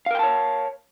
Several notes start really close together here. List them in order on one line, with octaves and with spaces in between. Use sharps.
F5 A#4 G5 A5 C#5